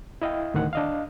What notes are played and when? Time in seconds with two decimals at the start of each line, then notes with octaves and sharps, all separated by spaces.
0.22 E4 D#5 F5 G5
0.54 D2 A2 D#3 F#5
0.73 D4 D#5 F5